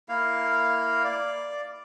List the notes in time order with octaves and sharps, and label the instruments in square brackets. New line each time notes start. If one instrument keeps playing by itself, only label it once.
[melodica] A#3 E4 F5
D5